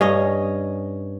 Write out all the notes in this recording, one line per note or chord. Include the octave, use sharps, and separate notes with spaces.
G2 C#4 D#5